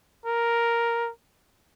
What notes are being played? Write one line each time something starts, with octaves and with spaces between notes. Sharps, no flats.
A#4